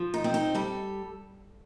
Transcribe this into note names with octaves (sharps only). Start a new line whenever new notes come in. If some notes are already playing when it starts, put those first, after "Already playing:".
Already playing: F3
D#4
C4
D#4
G3 A4